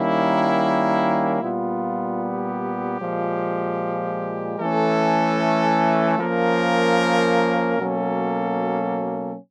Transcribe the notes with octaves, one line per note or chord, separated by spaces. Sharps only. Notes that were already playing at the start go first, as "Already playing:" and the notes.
Already playing: D#3 G3 A#3 C#4 E4
A#2 G3 B3 F4
G4
A#2 F3 G#3
E3 A3 C#4 A4
F3 A#3 C#4 A#4
B2 F#3 A#3 C#4 A4